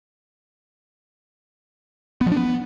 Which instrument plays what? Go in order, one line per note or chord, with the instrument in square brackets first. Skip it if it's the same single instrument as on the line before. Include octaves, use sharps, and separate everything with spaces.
[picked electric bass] B3
F3
D4
B3